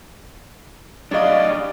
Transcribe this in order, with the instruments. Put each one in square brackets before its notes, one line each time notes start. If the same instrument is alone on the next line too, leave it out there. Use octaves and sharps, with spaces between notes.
[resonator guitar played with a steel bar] F#3 D#5 [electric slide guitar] D4 G4 F5 [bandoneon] D5